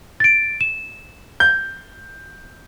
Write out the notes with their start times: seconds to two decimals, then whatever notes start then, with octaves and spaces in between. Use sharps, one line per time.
0.20 A6 D7
0.61 E7
1.40 G6